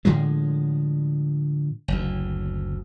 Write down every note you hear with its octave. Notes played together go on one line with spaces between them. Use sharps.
A2 D3 F3 G#3
F#1 D2